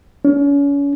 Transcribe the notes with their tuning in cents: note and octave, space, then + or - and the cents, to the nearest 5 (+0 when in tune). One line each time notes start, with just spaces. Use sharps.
C#4 +35